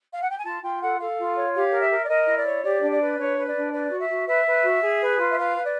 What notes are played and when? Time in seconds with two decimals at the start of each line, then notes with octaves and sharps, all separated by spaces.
0.13 F5
0.21 F#5
0.29 G5
0.37 G#5
0.44 F4 A5
0.62 F4 G5
0.81 A4 F#5
0.99 A4 F5
1.18 F4
1.36 C#5
1.54 G4 F5
1.72 A#4
1.81 E5
1.90 A#4
2.04 D5
2.08 A#4 D#5
2.26 E4
2.36 D5
2.45 C#5
2.63 G4 D5
2.82 D4
2.90 D5
2.99 B4
3.18 D4 C#5
3.36 B4
3.46 D5
3.55 D4
3.72 B4 D5
3.91 F#4
4.00 E5
4.09 F#4
4.27 B4 E5
4.45 B4
4.63 F#4
4.82 G#4
5.00 B4
5.19 F4
5.30 E5
5.36 B4 F5
5.54 B4
5.64 D5